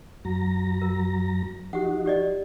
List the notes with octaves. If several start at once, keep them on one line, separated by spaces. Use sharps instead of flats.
F#2 F#3 A#5
A#4
F3 D#4 F#4 G4 F#5
G4 D5 D#5